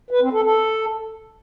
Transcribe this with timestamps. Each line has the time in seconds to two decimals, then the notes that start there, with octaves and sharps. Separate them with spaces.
0.10 B4
0.22 C4
0.33 A4
0.44 A4